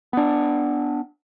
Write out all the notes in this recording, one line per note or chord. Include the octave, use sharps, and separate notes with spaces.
B3 D4